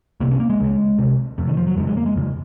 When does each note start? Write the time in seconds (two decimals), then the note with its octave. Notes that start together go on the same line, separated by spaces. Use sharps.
0.20 C2 C3 A#3
0.31 C#4
0.40 A#3
0.50 G#3
0.60 C#2 C#3
0.99 C2 C3
1.38 F2 C3
1.48 D#3
1.57 F3
1.67 F#3
1.77 F2 G#3
1.81 C#3
1.87 G#3
1.97 A#3
2.06 G#3
2.16 F2 C#3